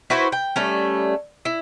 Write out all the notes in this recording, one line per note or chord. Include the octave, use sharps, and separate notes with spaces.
E4 F#4 B4 C5
G5
G3 A3 C#4
E4